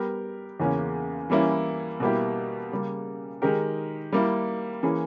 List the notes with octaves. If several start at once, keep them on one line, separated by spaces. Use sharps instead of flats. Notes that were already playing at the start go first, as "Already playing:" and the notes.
Already playing: G3 B3 G4 A#4
E2 C#3 E3 A#3 C#4
E3 G3 A#3 C#4 E4
B2 G3 A#3 E4 G4
C#3 G3 A#3
D#3 G#3 D#4 G4 A#4
G3 A#3 E4
E3 A#3 C#4 G#4